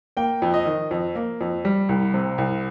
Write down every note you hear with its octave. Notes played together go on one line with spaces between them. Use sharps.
A#3 G5
F2
D#5
D#3
F2
A#3
F2
G3
C2
C3
C2